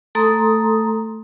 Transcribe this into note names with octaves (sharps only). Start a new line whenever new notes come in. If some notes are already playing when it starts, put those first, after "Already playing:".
A3 A4 A#5 C6 D#6